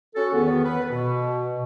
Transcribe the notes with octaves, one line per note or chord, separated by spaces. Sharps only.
C#4 F#4 A4
E2 D#3 B3
B4
B2